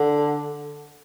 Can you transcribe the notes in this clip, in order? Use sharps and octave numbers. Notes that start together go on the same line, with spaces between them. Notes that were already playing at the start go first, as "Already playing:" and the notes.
Already playing: D3